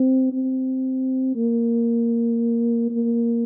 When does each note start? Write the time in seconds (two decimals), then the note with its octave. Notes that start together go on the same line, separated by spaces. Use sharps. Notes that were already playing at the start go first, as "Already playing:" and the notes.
Already playing: C4
0.33 C4
1.36 A#3
2.91 A#3